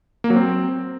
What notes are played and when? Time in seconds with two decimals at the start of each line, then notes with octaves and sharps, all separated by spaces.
0.24 A#3
0.30 F#3
0.36 C4